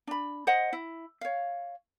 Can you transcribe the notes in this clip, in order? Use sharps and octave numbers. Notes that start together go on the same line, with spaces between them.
D4 B5
C5 D#5 F#5
E4
C#5 F5